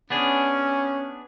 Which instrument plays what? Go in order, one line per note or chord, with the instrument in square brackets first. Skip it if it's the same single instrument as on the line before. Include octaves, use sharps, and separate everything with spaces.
[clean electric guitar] B3 D4 G#4 [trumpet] C#4